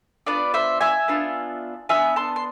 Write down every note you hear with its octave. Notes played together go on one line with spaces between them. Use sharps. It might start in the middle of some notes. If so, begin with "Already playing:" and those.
B3 D4 F4 B4 D5
C5 E5
E5 G#5
B3 D4 F4
B3 D4 F4 E5 G#5
A5 C6
C6